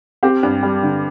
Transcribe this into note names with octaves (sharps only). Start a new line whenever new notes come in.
C4 G4
G2
G3
D3